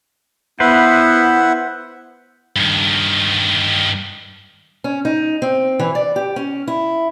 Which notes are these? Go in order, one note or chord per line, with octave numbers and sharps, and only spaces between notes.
B3 E4 B4 C5 E5 F#5
G2 D#3
C#4
D#4
C4
E3
D5
G4
C#4
E4